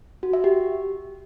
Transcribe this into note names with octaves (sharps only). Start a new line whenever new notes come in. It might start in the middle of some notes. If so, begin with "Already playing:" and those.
F#4
E5
G4